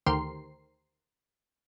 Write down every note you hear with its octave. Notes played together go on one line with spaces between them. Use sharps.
D2 D#3 G4 A#4 C5 C7